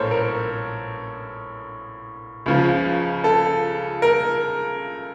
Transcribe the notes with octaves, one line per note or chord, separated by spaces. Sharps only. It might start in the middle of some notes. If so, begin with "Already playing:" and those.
Already playing: A#1 A2 A4 A#4 C5 C#5
A#4
C#2 C#3 F3
A4
A#4